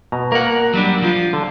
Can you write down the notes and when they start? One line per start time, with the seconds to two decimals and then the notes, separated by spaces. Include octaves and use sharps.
0.12 B2 A#5
0.32 A#3 A#4 F#5
0.73 F#3 G3 D4
1.02 F3 F4
1.33 D3